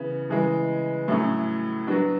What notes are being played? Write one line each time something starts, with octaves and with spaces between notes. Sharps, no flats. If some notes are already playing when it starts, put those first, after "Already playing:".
Already playing: C#3 E3 B3
C#3 E3 G#3
A2 F#3 A3 C#4
F#3 B3 D4 F#4